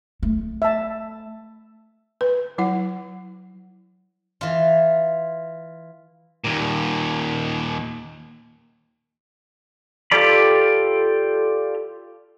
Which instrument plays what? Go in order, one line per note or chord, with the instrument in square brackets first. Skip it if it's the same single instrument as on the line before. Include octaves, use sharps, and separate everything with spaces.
[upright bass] A3
[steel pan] E5 A5
[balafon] B4
F#3 E4 F#5
[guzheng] E3 F4
[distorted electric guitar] D#2 A#2
[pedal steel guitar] F4 G4 A4 D5 B5